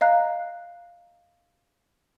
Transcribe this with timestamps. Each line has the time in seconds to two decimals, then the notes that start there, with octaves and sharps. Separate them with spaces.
0.01 D#5 F5 A#5 F#6